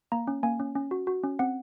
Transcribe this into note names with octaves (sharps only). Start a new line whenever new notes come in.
A#3 A#5
C#4
A#3 G#5
C#4
C#4
F#4
F#4
C#4
C4 F#5